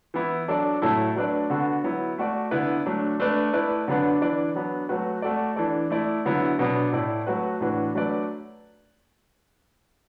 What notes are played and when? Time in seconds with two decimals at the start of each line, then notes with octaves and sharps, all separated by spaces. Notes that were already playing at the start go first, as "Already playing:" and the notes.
0.14 E3 B3 E4
0.48 F#3 D4 A4 D5
0.82 A2 F#3 A3 E4 A4
1.16 F#3 A3 D4 B4 D5
1.50 D3 B3 F#4 A4
1.84 F#3 B3 E4
2.18 A3 F#4 D5
2.51 D3 B3 E4 B4 D5
2.86 F#3 A3 D4
3.20 A3 D4 B4 D5
3.53 A3 E4 B4 D5
3.88 D3 F#3 B3 D4 B4
4.21 E3 D4 B4 D5
4.56 F#3 B3 D4
4.89 F#3 A3 F#4 B4
5.22 A3 F#4 A4 D5
5.56 E3 D4 A4 D5
5.90 A3 E4 D5
6.25 D3 F#3 B3 E4
6.59 B2 F#3 B3 D4
6.93 A2 A3 E4 D5
7.27 F#3 A3 F#4 B4
7.61 A2 E3 D4 F#4 B4
7.95 F#3 A3 D4 B4 D5